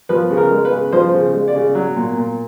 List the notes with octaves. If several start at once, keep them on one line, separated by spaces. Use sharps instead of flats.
F3 B4
C#3
A#4
G#3
B4
C#3
F3 C5
C#3
G#3
D5
C#3
F#3
A#2
A#2